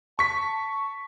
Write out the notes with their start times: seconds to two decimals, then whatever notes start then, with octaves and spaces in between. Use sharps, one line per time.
0.19 A5 C#6 B6